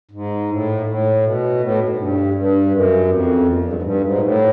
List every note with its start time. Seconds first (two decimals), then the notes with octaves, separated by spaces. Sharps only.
0.11 G#2
0.48 A2
0.86 A2
1.22 B2
1.60 A2
1.78 G#2
1.89 G#2
1.97 G2
2.34 G2
2.71 F#2
3.08 F2
3.46 E2
3.55 F2
3.64 G2
3.73 G#2
3.82 G2
4.01 G#2
4.13 A#2
4.20 A2